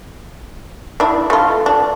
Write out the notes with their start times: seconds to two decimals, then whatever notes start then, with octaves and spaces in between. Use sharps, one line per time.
1.00 D4 E4
1.30 A3 F4
1.66 D4